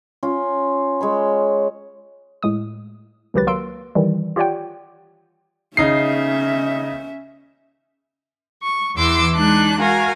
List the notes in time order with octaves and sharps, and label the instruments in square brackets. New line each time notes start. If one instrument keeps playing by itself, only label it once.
[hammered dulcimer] C#4 F4
G#3 C#5 B5
[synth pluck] A2 G#3 D#6
C#2 D#3 F#3 G4 B4 A6
F#3 A#3 C6 E6 D7
D#3 E3 G3
F4 G4 C#5 D5 F#5 G5
[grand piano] C#3 D#4 C7 [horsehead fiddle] C#4 E5
[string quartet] C#6
E2 E3 C6 D6 E6
G#3 D4 D#4 F#6
F#4 A#4 F5 G#5